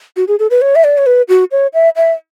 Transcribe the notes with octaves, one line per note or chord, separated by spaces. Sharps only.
F#4
G#4
A4
B4
C#5
E5
D5
C#5
B4
F#4
C#5
E5
E5